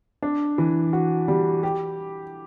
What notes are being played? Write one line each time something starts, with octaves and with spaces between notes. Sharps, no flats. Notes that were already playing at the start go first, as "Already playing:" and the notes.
D4
E3
F#4
G3
G4